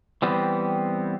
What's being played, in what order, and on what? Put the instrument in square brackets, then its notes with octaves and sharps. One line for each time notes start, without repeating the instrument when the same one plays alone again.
[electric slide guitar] E3 G3 B3 C4